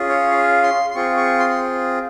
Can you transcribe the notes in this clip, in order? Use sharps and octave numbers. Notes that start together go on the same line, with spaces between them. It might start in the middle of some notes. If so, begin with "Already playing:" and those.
Already playing: C#4 F4 G#4
C#5
F5
C6
C6
C4 F4 G#4 C#6
C#6
C6
C6